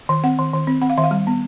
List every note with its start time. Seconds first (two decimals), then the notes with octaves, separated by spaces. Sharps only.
0.09 D#3
0.24 C4 F#5
0.39 D#3
0.53 D#3
0.67 C4
0.82 C4 F#5
0.90 F5
0.98 D#3 E5
1.04 F5
1.11 G3
1.27 B3